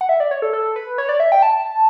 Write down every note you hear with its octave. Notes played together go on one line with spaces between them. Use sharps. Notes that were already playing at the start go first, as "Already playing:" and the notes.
F#5
E5
D5
C#5
A4
A4
B4
C#5
D5
E5
G5
A5